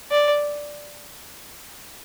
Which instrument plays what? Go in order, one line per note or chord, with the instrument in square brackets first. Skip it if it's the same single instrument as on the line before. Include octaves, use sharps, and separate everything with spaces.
[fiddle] D5